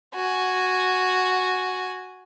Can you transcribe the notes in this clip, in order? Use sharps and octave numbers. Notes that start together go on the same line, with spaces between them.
F#4 G#5